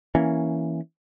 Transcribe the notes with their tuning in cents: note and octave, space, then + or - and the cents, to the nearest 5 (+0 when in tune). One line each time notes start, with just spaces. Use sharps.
E3 +0 A#3 +10 C#4 +0